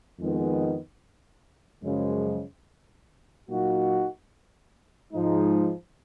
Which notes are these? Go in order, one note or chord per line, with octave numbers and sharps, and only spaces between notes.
F2 D#3 G#3 B3
F#2 C#3 F3 G#3
A#2 F#3 A#3 D#4 F#4
G#2 F3 G#3 D#4